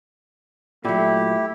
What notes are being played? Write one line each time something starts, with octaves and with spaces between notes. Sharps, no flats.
A#2 F#3 A3 E4 G4